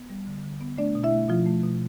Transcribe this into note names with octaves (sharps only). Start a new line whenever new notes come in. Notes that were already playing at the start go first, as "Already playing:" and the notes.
Already playing: B3
G3
D3
D3
B3
A3 D4 D5
B2
E4 E5
A3
B2 F3 F4
A3
B2